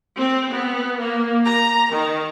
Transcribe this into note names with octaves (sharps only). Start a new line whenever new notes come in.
C4
B3
A#3
A#5
D#3